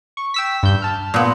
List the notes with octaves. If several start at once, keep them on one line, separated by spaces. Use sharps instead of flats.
C#6
G5 E6 B6
G2 G6
A5 F6
A#2 B3